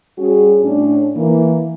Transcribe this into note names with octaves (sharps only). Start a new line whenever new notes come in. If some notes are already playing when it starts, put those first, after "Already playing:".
G3 C#4 F#4 G#4
A2 C#4 D4
E3 A#3